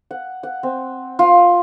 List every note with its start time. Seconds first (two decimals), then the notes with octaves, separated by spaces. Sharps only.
0.11 F#5
0.43 F#5
0.63 C4
1.19 F4